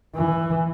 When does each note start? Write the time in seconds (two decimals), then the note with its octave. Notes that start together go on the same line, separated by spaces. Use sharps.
0.15 E3